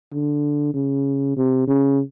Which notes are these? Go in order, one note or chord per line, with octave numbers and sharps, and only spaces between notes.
D3
C#3
C3
C#3